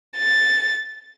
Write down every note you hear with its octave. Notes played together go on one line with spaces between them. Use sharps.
A6